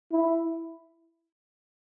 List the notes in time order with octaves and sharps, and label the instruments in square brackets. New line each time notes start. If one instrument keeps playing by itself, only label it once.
[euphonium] E4